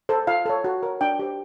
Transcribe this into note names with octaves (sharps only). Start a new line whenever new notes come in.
A4 C5
F4 F5
A4 C#5
F#4
A#4 C#5
D4 G5
G4 C5